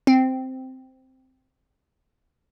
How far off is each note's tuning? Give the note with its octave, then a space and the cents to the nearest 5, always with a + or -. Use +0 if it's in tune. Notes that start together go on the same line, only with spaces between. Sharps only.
C4 -5